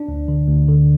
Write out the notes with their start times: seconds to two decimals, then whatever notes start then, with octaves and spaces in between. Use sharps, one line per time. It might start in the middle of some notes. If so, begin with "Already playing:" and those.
Already playing: D4
0.08 D2
0.28 D3
0.48 D2
0.68 D3